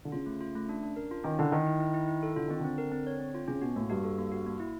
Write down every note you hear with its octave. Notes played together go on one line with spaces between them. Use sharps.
D3
C#3 F4
A3
F4
A3
D4
D4
A#4
F4
D#3 C#4
D3 E4
D#3 E4
E4
E4
E4
E4
A4
D3 F4
D#3 C4
D3 C4
A#4
C4
C#5
C4
F4
C#3 C#4
B2 F#4
A2 A#3
G2 F#4
A4
A#3
F#4
A#3
E4